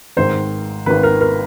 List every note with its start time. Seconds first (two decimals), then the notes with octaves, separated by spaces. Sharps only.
0.17 G#1 G#2 D#3 C5
0.86 G#1 G#2 D#3 B4
1.03 A#4
1.21 A#4